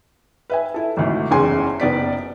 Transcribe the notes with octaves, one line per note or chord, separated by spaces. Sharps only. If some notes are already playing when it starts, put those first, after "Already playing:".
B4 E5 G#5
E4 A4
G#1 D2
F#1 E2 C#3 G#5 C6
F#1 B3 D5 B6